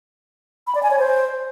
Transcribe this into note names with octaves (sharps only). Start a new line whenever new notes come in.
B5
D5
G#5
C#5
C5